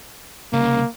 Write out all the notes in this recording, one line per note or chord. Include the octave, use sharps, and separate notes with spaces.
C2 C#3 A#3